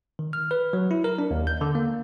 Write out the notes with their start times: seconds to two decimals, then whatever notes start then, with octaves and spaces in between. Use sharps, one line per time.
0.19 D#3
0.33 F6
0.51 B4
0.73 F#3
0.91 E4
1.04 A#4
1.19 D4
1.31 D#2
1.47 G6
1.61 D3
1.75 A#3